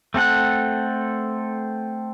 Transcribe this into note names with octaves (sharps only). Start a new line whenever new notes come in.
A3 C4 A4 F#5